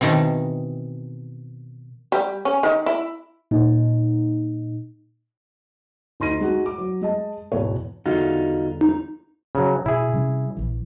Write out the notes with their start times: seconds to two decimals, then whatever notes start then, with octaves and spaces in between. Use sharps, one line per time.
0.01 B2 D#3 E3 C4
2.12 G3
2.45 C#4
2.63 D#3
2.86 E4
3.51 A#2 D#4
6.20 D2 D#4 C6 A#6 D#7
6.40 G#3 D#4 F#4
6.66 D6
6.78 F#3
7.01 G#3 D#5 A5
7.52 G#1 E2 B2 C#5
8.06 E2 D3 G3 D#4 F4 F#4
8.81 D#4
9.55 C#3 F#3
9.86 B2 E4 G#4
10.13 C3 G3 C#4
10.57 A#1 E3